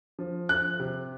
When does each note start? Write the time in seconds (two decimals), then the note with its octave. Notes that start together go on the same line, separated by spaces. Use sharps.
0.19 F3
0.49 F3 F#6
0.80 C3